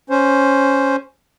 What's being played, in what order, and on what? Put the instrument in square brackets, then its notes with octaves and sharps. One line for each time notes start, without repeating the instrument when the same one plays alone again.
[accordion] C#4 C5